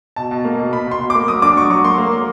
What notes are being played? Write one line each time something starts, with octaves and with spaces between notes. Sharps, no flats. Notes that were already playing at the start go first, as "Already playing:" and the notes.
B2 A5
B2
A#3
B2
B2 B5
B2 C6
B2
A#3 D6
F#3 D#6
D4 D6
F#3 C#6
F#3 C#6
A#3 C6
A#3
F#3